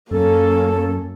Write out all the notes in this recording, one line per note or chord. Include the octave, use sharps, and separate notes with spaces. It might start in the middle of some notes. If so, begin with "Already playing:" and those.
F#2 A#3 C#4 A4